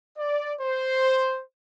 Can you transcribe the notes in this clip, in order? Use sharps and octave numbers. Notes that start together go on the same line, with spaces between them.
D5
C5